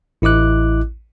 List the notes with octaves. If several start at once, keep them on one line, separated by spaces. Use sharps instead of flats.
A1 E4 D#5 D6 F#6